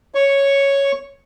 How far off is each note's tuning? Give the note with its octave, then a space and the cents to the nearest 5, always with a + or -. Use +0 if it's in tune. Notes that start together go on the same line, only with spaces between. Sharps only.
C#5 +0 C#6 +0